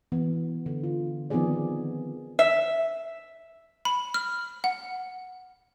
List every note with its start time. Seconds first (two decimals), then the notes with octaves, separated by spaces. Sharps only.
0.12 E3 B3
0.66 D3
0.84 F4
1.30 D#3 F3 B3 C4 G#4 D5
2.39 E5
3.85 B5
4.14 F6
4.64 F#5